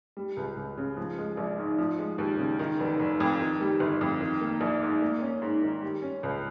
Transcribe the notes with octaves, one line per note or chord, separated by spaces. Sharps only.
G3
C#2
C#2
C#3
F3
G#3
A#1
G#2
F3
G#3
D#2
C#3
D#3
F1
F1
F2
D#3
G3
G1
F2
D#3
A#3
A#1
G#2
A#3
C#4
G#2
D#3
G3
C#4
C#2